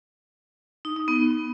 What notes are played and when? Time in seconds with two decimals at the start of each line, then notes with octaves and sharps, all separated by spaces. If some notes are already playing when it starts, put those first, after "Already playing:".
0.85 D#4
0.96 D#4
1.08 B3